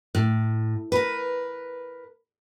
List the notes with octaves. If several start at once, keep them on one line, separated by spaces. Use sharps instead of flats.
A2
A#4 B4